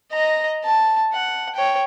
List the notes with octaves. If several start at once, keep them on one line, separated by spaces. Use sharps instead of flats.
D#5 A#5
A5
F#5
C#5 G5